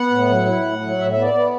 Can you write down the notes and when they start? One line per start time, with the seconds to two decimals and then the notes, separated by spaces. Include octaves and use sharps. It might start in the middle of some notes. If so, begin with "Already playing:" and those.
Already playing: B3 F#5
0.11 A2
0.29 F#3
0.46 E4
0.64 A2
0.81 F#3
0.98 A2 E5
1.11 B3 E5
1.22 D5
1.34 B3